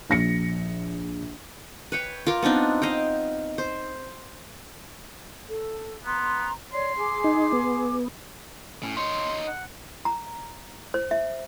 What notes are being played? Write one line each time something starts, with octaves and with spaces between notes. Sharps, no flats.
A#1 A#6 C#7
B4 C#5 G5
F4 A#4 D6
B3 C4 D4 D#4
D#5 F5 G5
C5
A4
B3 A#5 C6
C#5 D5 C6
G#4 D6
D#4
B3
A2 C#4
D#4 C#5 C6
F#5
A#5
C5
E5